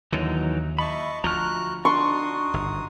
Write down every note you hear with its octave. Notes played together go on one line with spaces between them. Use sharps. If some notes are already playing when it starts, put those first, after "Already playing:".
D#2 D3 E3 F#3 D#4
D#5 E5 A5 B5 C#6
D2 F3 F#4 A#5 F6 F#6
D4 D#4 F#4 C6 C#6 D#6
G1